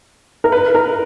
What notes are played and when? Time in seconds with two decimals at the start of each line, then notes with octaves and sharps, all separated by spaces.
0.44 A#4
0.52 B4
0.75 A#4